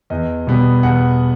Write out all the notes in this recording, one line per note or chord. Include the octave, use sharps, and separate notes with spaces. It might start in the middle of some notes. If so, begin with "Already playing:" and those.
E2 D#5
B2 G3 B3
E2 F#5